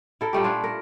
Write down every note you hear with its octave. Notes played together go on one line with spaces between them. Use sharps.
E4 A4 A#4
A#2 G3 A3 G4
D4 E4 F4
A4 A#4